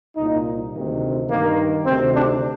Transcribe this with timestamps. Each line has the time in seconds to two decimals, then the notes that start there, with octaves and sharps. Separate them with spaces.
0.17 C2 A#2 D#4
0.73 D2 C3 D#3
1.30 G2 D#3 A#3
1.86 D2 C3 D#3 C4
2.14 D4